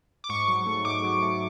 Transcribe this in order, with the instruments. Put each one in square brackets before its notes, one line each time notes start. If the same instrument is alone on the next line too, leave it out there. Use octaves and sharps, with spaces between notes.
[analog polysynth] D6
G#2 C#6
F#3
A3
G#2 D6
F#3
A3